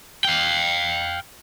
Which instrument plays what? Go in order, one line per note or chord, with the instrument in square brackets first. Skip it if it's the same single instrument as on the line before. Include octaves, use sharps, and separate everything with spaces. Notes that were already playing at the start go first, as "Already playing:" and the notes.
[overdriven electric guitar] F5 G5